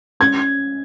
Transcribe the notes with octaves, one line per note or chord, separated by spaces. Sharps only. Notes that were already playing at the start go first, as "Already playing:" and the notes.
C#4 G#6